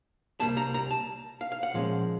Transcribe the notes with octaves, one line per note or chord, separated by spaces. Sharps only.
C2 A#2 G3 A#3 A5
A#5
A#5
A5
F5
F5
F#5
A#2 F3 G#3 C#4